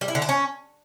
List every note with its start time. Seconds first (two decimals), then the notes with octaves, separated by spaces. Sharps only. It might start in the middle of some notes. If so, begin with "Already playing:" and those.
0.01 G3
0.08 E4
0.15 D3
0.22 D4
0.29 C#4